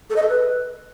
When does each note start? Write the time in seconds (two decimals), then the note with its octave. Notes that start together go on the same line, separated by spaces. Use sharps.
0.10 A4
0.16 D#5
0.22 A4
0.28 B4